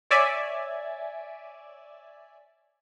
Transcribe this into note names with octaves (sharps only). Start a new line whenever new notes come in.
C#5 D5 E5 G#5